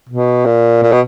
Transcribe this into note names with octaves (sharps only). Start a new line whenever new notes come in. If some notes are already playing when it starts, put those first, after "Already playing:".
B2
A#2
A#2
B2